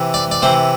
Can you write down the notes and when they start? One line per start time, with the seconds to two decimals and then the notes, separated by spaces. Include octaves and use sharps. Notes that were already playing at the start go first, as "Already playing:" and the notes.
Already playing: C3 E3
0.14 D5
0.31 D5
0.42 C3 E3 C5